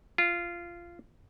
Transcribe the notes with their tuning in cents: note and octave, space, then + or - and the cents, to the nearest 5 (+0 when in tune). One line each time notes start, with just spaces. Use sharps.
F4 -15